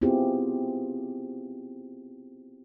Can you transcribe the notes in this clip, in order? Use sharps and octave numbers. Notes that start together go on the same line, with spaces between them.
B3 C4 E4 F4 G4 G#4